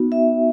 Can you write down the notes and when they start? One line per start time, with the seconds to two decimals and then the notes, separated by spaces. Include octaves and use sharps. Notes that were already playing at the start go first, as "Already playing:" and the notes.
Already playing: B3 D#4 F#4
0.12 E5